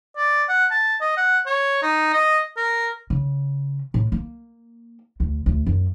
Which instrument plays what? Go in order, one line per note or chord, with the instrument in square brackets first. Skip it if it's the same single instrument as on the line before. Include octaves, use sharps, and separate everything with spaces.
[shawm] D5
F#5
A5
D#5
F#5
C#5
D#4
D#5
A#4
[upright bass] C#3
A2
A#3
D2
D2
F#2